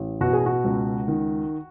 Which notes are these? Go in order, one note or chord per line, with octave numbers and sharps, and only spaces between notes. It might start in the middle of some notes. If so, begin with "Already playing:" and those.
Already playing: A1
B2 F#4
G#4
F#4
C#2
D#3